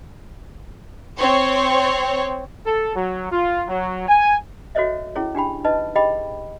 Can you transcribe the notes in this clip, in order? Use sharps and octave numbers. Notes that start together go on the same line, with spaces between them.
C4 C#5
A4
F#3
F4
F#3
G#5
F#4 A4 C5 C#5 D#5 E5
C#4 E4 G#4 C#5
D4 G4 G5 B5
D#4 B4 D#5 A5
G4 G#4 D#5 G5 B5